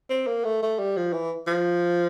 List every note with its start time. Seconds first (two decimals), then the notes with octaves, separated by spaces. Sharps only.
0.10 C4
0.27 A#3
0.45 A3
0.63 A3
0.79 G3
0.97 F3
1.13 E3
1.48 F3